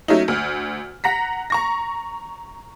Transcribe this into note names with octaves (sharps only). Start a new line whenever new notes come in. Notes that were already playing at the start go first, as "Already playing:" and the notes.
F#3 A3 C#4 D#4
D2 F6
F#5 A#5 A#6 B6
A#5 C#6 A#6